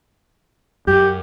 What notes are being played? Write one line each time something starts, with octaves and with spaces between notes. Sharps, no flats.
F#2 G4